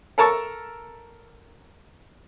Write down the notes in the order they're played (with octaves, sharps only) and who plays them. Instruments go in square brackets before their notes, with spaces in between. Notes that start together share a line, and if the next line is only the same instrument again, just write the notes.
[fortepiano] A4 A#4 A5 C#6